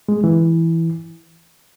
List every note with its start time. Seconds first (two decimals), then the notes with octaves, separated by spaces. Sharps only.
0.09 G#3
0.24 E3